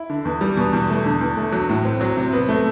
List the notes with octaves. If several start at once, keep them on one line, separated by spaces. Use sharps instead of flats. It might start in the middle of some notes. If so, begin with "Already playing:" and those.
Already playing: E4
D3
E2
G3
B2
E2
A3
D3
E2
A3
F#3
A2
C4
F#3
C3
B3
A3